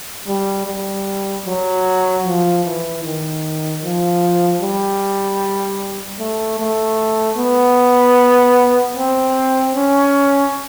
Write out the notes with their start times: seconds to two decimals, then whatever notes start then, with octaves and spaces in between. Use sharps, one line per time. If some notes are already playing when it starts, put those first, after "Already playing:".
0.27 G3
0.67 G3
1.46 F#3
2.25 F3
2.65 E3
3.04 D#3
3.82 F3
4.61 G3
6.19 A3
6.59 A3
7.38 B3
8.95 C4
9.75 C#4